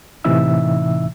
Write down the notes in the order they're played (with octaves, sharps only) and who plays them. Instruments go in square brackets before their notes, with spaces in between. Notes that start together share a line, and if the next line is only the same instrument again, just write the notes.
[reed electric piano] A2 C3 E3 D#4 E5 E6